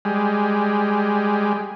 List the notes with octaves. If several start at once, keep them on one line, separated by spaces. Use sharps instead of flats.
G3 G#3